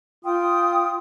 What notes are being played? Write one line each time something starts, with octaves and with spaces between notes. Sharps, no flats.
F4 G5 D#6